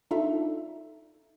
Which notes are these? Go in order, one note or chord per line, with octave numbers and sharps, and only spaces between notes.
D4 D#4 F4 A4 E5